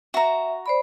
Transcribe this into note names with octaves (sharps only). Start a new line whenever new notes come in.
F#4 E5 A#5
C5 D5 B5